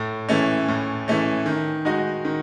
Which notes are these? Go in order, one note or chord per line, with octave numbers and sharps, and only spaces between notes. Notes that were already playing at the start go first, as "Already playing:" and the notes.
Already playing: A2
E3 A3 C#4
A2
E3 A3 C#4
D#3
G#3 D#4 F#4
D#3